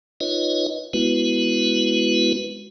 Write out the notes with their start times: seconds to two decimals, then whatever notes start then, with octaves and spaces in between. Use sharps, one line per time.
0.21 D#4 F4 B4 C#5 D#5
0.93 G#3 B3 E4 F#4 B4